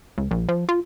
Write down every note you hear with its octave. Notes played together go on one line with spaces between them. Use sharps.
C#2
A#1
F3
F4